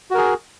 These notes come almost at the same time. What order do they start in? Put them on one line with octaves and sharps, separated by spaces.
F#4 A#4 G#4